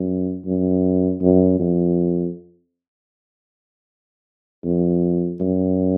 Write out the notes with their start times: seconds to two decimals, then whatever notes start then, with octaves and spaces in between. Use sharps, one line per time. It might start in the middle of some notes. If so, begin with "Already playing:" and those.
Already playing: F#2
0.46 F#2
1.21 F#2
1.60 F2
4.65 F2
5.40 F#2